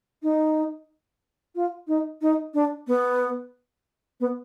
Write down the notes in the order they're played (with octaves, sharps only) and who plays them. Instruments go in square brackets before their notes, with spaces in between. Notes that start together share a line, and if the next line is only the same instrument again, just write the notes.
[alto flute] D#4
F4
D#4
D#4
D4
B3
B3